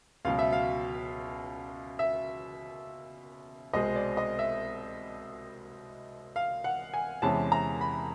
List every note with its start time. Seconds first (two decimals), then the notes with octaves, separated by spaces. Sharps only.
0.25 C#2 B2 F#3 F5
0.39 E5
0.52 F5
1.99 E5
3.73 C2 B2 G#3 C4 D#5
3.96 D5
4.17 D#5
4.39 E5
6.36 F5
6.64 F#5
6.94 G#5
7.22 E2 C3 E3 G#3 C#4 A5
7.52 A#5
7.81 B5